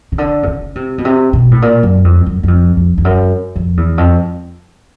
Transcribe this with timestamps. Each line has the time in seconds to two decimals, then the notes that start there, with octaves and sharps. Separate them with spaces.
0.12 C#3
0.18 D3
0.43 C3
0.47 C#3
0.75 C3
0.98 B2
1.05 C3
1.33 B2
1.51 A2
1.62 A#2
1.83 F#2
2.04 F2
2.26 F#2
2.43 F#2
2.48 F2
2.77 F2
2.98 F2
3.05 F#2
3.56 F2
3.77 E2
3.98 F2